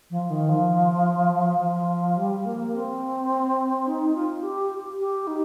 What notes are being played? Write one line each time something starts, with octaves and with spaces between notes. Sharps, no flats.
F3
D#3
F3
F3
G3
A#3
C4
D#4
F4
G4
G4
D#4